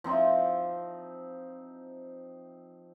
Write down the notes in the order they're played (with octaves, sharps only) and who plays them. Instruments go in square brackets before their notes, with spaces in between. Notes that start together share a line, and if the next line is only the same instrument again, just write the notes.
[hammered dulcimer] F3 C4 D#4 E5